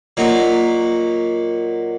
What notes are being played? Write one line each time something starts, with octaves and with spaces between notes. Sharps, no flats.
A#2 F#3 D#4